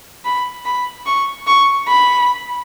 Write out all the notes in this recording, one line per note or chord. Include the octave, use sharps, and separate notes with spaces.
B5
B5
C#6
C#6
B5